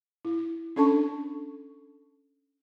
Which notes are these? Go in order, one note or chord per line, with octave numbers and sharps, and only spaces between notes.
E4
C#4 D4 A4 A5 C#6